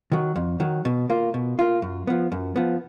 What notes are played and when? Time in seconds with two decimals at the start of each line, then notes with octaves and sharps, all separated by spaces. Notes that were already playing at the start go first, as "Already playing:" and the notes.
0.12 D#3 F#3
0.36 F2
0.60 D#3 F#3
0.85 B2
1.10 A#3 F4
1.34 B2
1.59 A#3 F4
1.82 F#2
2.07 F3 B3
2.32 F#2
2.56 F3 B3